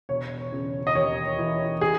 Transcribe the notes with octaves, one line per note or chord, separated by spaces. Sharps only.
E1 C#5
C#3
D#5
D#2 C#5
E3
G#4